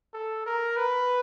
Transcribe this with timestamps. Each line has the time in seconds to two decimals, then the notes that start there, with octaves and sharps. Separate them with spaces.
0.14 A4
0.46 A#4
0.77 B4